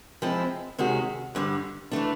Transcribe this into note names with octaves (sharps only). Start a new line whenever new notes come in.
F3 G#3 C4 E4
C3 D#3 G#3 C#4 F#4
G2 D3 G3
E3 A3 D4